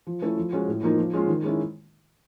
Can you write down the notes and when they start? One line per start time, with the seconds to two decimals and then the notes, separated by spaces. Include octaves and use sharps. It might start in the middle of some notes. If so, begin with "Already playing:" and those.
0.07 F3
0.22 A3 C#4 E4 A4
0.37 F3
0.52 G#3 C#4 F#4
0.68 A2
0.83 F3 A#3 D#4
0.98 F3
1.14 G#3 C#4 F4
1.28 D#3
1.44 G#3 C#4 E4